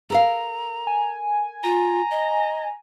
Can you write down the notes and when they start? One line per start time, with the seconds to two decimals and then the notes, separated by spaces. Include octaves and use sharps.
0.10 A4 A#4 F5 A#5
0.87 G#5
1.64 F4 A#5
2.11 D#5